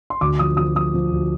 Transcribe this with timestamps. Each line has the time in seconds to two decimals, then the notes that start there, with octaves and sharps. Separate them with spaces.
0.10 C6
0.21 D2 D6
0.39 F3 D#6
0.57 F3 D#6
0.75 F3 D#6
0.94 F3
1.12 D2